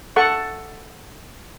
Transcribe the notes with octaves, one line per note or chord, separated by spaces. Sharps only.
A4 F#5 A5 C#6